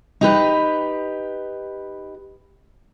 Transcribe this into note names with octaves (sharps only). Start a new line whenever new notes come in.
D#4 G4 B4